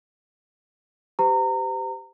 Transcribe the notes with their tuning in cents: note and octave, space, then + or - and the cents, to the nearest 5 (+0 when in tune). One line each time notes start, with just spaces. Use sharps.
G4 +0 C5 -45 A#5 -30